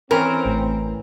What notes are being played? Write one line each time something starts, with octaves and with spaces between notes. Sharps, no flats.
E3 C4 C#4 A#4
A1 A2